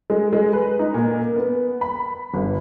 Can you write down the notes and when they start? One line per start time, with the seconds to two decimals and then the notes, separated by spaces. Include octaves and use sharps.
0.10 G#3
0.33 G#3
0.53 B4
0.79 D#4
0.94 A#2
1.20 A#3
1.36 B3
1.81 B5
2.34 G1